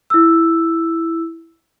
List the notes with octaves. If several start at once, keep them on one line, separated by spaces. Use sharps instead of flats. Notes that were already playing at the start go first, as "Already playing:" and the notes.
E4 E6